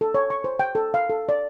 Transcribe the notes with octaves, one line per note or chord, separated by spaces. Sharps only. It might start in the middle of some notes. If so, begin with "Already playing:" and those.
A4
C#5
C#6
C5
G5
A4
F5
A4
D5